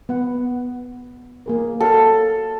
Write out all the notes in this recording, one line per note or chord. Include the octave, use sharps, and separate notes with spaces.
B3 F#5
A#3 G#4 A#4
F#4 A4 C#5 F5